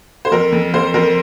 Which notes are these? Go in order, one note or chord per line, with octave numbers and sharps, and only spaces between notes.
C5
F2 A#4
F2
F2 C5
F2 A#4